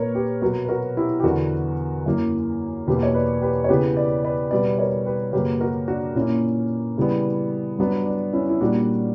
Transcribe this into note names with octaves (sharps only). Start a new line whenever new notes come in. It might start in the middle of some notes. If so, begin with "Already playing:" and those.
Already playing: A#2 A#3 A#4 B4 C#5
G4 B4
B2 F#3 B3 F#4 A#4
B4
F#4 A#4
E4 G4
G4
E2 D3 F#3 B3 F#4 A#4
F#2 E3 A#3
E2 B2 A#3 G4 B4
C#5
B4 D5
G4 B4
C#5
C#3 E3 B3 G4 B4
B4 D5
B4 D5
B2 G3 B3 B4 D5
A#4 C#5
G4 B4
F#2 C#3 F#3 A#3 G4 B4
F#4 A#4
D4 F#4
A#2 A#3 C#4 E4
C#3 E3 G3 B3
G2 F#3 B3 D4
D4
C#4 E4
E4
A#2 G3 A#3 D4 F#4